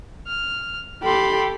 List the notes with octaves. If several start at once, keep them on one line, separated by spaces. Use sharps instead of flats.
F6
G4 A4 B5 C6